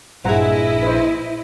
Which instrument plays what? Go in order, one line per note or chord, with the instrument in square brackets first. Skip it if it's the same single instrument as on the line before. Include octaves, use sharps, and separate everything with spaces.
[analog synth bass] A#1 [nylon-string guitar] G2 G#4 [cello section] E4 D#5 [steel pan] C5 F#5 A#5
[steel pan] B4 C5